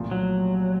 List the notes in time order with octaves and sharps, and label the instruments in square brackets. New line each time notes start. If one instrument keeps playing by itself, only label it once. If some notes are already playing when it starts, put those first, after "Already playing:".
Already playing: [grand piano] C2 A#2 F3 A3
[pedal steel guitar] F#3